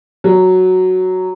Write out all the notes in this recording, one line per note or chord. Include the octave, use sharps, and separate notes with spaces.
F#3